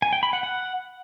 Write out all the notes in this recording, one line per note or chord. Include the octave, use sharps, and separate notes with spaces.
G#5
G5
B5
F#5
F#5